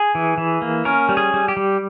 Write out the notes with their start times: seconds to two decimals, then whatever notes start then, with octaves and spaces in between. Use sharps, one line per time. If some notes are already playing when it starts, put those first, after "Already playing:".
Already playing: G#4
0.15 E3
0.38 E3
0.62 A#3
0.85 C#4 A#4
1.09 G3
1.17 G#4
1.34 G3
1.48 G4
1.57 G3